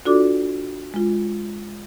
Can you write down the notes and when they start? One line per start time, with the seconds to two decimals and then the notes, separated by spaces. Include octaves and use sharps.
0.05 D4 F4 F#4 A4 D5 D6
0.94 G#3 F4